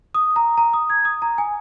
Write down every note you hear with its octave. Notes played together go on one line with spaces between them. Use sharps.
D#6
A#5
A#5
D#6
G#6
D#6
A#5
G#5